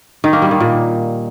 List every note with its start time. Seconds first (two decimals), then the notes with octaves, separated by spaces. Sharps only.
0.24 D#3
0.33 A#3
0.42 G3
0.51 D#3
0.60 A#2